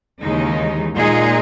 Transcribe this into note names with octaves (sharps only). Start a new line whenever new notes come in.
D#2 C#3 E3 G#3 D#4
A#2 G#3 D#4 G#4